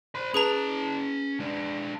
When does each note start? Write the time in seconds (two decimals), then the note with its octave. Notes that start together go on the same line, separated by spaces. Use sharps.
0.15 C5 B5
0.34 C#4 G#4 B4 A5 A#5
1.40 G#3 D4